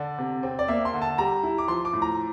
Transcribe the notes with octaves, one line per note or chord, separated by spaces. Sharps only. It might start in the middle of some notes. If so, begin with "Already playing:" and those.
Already playing: D3 D5
C3
C4
D5
A#3 E5
C6
D3
A5
G3 A#5
E4
D6
F3 C6
D6
A2
A#5